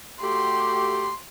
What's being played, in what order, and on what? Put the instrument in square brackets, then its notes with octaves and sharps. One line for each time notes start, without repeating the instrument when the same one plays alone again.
[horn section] A3 F#4 G4 [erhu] C6